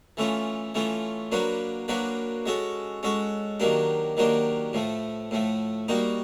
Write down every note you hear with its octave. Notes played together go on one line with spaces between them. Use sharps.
E3 A3 C#4 F4
E3 A3 C#4 F4
F#3 A#3 D4 F#4 B4
F#3 A#3 D4 F#4 B4
G#3 C#4 F#4 A4
G#3 C#4 F#4 A4
D#3 F#3 A#3 D4 G4
D#3 F#3 A#3 D4 G4
A2 F3 A3
A2 F3 A3
G3 A#3 D#4 F#4